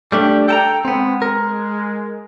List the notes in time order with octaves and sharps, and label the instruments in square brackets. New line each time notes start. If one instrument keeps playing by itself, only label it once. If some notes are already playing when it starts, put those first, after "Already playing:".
[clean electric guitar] G3 A3 D4 [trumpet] G4
[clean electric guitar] A4 A5 A#5 [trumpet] G5
[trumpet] G#3 [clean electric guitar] B3 C4
[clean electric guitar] A#4